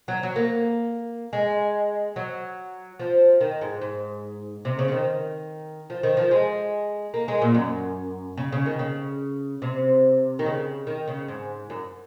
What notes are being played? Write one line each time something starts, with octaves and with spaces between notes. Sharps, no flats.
F#3
F#3
A#3
G#3
F#3
F3
D#3
G#2
G#2
C3
C#3
F3
D#3
F3
D#3
F3
G#3
A#3
G#3
A#2
F#2
C#3
C#3
D#3
C#3
C3
D#3
C#3
D#3
C#3
G#2
F#2